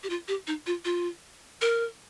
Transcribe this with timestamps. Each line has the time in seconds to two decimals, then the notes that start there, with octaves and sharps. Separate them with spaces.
0.03 G4
0.10 F4
0.28 G4
0.47 D#4
0.67 F4
0.85 F4
1.62 A#4